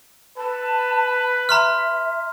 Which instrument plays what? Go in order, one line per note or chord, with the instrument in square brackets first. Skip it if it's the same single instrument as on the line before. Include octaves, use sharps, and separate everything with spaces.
[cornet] B4 [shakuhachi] A5
[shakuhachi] E5 [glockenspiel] A#5 C6 F6